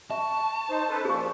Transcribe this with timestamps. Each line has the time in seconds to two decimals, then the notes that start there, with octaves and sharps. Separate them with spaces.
0.11 E5 A5 C#6
0.70 D#4 C5
0.89 C#4 A4 B4 C5
1.05 A#2 F3 G#4 C#6